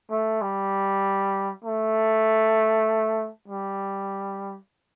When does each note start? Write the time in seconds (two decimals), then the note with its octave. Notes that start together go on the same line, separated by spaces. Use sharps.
0.10 A3
0.41 G3
1.64 A3
3.48 G3